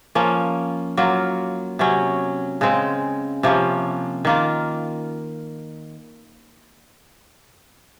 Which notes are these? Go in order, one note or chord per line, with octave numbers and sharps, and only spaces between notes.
F3 A#3 C#4
F#3 A#3 F4
C3 F#3 C#4
C#3 G#3 C4
C3 F3 A#3 C#4
D#3 A#3 F4